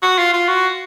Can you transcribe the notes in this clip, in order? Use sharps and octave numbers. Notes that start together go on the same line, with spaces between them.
F#4
F4
F4
F#4